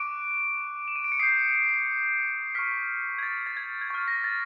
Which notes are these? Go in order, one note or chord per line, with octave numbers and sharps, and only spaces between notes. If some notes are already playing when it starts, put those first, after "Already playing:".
Already playing: C#6 D6 F#6 D7
E7
D#7
D7
C#7
D#6 G6 C7
C#6 F6 B6
G#6
A6
A6
G#6
G#6
C#6 F6 A6
A#6
A6